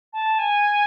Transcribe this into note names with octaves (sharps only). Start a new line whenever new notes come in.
A5
G#5